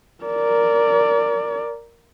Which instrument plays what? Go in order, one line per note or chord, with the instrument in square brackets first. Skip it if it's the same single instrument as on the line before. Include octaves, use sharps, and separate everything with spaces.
[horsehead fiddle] A#4 D5